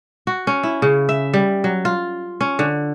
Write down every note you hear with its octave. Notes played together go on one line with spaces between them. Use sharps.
F#4
C#4
E4
C#3
E5
G3
F#3
F4
C#4
D3